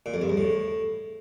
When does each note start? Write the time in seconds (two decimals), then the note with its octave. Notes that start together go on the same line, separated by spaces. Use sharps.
0.06 A#2
0.14 F2
0.22 G2
0.29 E2
0.37 A2